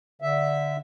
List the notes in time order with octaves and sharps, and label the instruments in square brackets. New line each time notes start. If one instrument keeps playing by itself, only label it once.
[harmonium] D3 E5